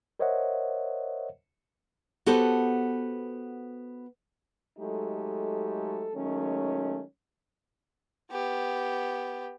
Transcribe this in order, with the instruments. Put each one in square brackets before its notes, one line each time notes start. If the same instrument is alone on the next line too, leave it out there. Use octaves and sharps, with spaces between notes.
[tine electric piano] A#4 C5 C#5 D#5 E5 F#5
[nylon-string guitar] B3 F#4 G4 A4 B4 C5
[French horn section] F#3 G#3 A3 D#4 G4 A4
D#3 F#3 G#3 A3 C#4
[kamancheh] B3 G4